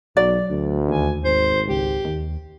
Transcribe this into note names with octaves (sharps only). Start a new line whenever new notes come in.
B1 F#3 D5
D2
D#2 G#5
G#1 C5
C#2 G4
D#2